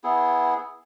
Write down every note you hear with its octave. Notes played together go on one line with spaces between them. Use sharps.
B3 E4 G#4